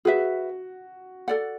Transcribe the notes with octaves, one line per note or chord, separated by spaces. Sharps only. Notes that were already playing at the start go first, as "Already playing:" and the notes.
F#4 G#4 B4 E5
A4 D5 F#5